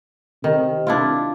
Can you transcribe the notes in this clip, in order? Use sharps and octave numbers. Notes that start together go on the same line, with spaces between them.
C3 D#3
D4 E4 F4